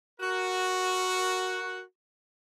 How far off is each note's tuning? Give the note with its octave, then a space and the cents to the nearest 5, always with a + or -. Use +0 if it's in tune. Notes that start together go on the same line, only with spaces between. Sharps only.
F#4 +0 A#4 +0